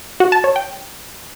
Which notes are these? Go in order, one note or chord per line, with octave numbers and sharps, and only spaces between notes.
F#4
A5
C#5
G5